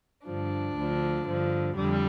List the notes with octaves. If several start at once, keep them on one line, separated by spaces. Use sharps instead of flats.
G2 D3 F3 D4
D2 D3 F3
G2 D3 F3
F2 D3 G3